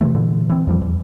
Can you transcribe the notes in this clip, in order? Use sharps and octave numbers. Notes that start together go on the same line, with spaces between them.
C3 D#3 E3 A3
A#2 D3 E3
E3 C4
F2 F3 G3
E2